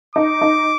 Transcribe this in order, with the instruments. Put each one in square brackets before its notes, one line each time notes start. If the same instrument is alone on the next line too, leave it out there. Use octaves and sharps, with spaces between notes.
[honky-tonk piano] D#4 [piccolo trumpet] D6
[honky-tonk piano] D#4